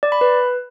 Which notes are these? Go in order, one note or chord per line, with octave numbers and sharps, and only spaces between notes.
D5
B5
B4